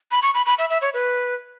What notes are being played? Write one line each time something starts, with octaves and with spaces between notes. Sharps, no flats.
B5
C#6
B5
B5
E5
E5
C#5
B4